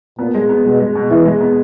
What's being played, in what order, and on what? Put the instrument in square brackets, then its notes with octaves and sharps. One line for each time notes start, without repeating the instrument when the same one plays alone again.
[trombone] A#2 [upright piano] B3
[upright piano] G#3
B3
[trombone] B2 [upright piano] G#3
[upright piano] G#3
B2
[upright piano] B2 [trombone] E3
[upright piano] G#3
B3